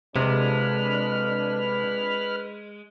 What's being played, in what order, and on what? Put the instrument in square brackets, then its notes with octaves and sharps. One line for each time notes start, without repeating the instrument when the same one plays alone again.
[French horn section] F2 D4 [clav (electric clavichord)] C3 [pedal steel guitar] G#3 [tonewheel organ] B4 B5 F6